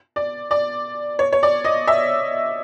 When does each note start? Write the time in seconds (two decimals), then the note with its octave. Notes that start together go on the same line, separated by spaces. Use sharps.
0.16 D5
0.51 D5
1.19 C#5
1.32 C#5
1.43 D5
1.65 D#5
1.87 E5